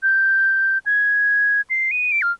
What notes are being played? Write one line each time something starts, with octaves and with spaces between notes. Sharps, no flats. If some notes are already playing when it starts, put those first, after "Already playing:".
G6
G#6
C7
D#7
D7
F6